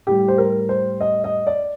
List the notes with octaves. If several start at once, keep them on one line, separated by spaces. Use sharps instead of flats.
A2 G3 G4
C5
A#4
C5
D#5
D#5
D5